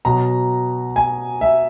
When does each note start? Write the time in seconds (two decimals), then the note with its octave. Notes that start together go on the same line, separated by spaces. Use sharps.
0.05 B2 F#3 A#5
0.96 G#5
1.41 E5